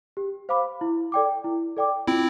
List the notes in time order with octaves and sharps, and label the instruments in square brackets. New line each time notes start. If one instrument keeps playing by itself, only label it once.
[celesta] G4
C5 F5 B5 D6
E4
A4 D5 G5 D6
E4
A4 D5 G5 D6
[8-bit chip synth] C4 E4 [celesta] F4